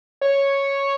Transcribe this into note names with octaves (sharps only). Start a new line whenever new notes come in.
C#5